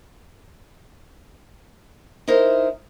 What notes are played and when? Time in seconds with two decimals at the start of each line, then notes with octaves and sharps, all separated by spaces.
2.28 D#4 E4 A#4 C5